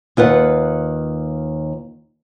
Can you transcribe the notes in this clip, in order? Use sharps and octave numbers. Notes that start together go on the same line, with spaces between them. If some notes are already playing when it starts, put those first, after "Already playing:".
D#2 F4 B4 F#5